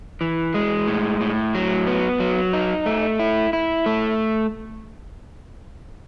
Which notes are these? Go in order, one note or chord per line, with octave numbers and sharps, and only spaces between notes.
E3
G#3
A2
A2
F#3
B3
F#3
D#4
A3
E4
E4
A3